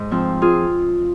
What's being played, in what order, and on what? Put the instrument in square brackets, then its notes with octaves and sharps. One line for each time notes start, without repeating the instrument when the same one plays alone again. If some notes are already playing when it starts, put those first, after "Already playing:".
Already playing: [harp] G#2
F3 C4
F4 G#4